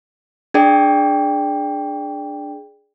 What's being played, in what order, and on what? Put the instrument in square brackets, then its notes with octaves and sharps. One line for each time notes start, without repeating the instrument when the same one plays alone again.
[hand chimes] D4 G#4 D5 G5